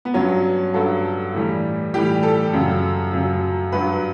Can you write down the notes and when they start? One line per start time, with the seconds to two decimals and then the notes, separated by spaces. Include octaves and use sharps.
0.05 B3
0.14 G2 F#3 C#4
0.74 G2 F#3 A4
1.33 A2 E3 G3
1.94 A2 E3 G3 G4
2.23 A4
2.53 F#2 C#3 F#3
3.13 F#2 C#3 F#3
3.72 G2 F#3 B4